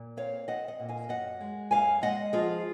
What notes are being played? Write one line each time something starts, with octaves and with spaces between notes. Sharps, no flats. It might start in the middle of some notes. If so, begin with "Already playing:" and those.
Already playing: A#2
C4 C#5 F5
C4 D#5 F#5
D#5 F#5
A#2
F5 G#5
F#2 D#5 F#5
G#3
F#2 F5 G#5
G#3 D#5 F#5
F3 F4 G#4